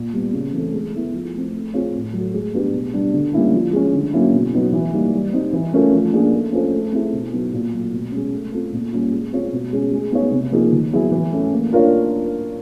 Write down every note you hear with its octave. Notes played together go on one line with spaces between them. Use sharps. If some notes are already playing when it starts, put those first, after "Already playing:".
Already playing: A#2
G3 B3
C#3
E3 A3 C4
G#3
B3 E4 A4
F3
A3 C4
A3
C4 F4 G#4 C#5
A2
F#3 A3
G#3
B3 D4 G4 B4
B2
G3 B3 D4
D3
G3 A#3 C#4 E4
F3
G#3 C#4
D3
F#3 A#3 C#4 E4
B2
F#3 B3 D#4
E3
G3 A#3 D#4
G3
C4 D#4
E3
A3 C#4 F4 A#4
F3
A#3 D4 F4 G#4
A3
C#4 F4 A4 C5
A3
C4 E4 G#4
B2
F#3 B3 D#4
A#2
F#3 A3
B2
G#3 C#4
A3
C4 F4 A4
A#2
G3 A#3 C#4 F4
G#3
C4 F4 G#4 C#5
B2
G#3 C#4
G#3
B3 D#4 G#4 C#5
C3
F3 A#3 D#4 G#4
D#3
F#3 B3 E4 G#4
E3
A3 C#4
A#3
D4 F4 A#4 C#5